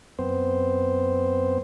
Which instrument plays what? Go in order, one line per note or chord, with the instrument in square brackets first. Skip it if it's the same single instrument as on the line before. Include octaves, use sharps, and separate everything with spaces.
[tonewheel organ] F#2 B3 C4 C5